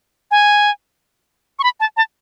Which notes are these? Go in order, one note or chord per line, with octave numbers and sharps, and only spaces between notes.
G#5
C#6
B5
A5
A5